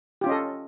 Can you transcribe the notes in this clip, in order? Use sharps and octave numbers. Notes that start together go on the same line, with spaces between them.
C#4 F4 G4 A4 D#5